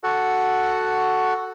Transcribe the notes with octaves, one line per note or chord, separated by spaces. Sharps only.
F#4 A4 F#5